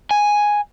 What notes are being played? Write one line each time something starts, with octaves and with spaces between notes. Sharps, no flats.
G#5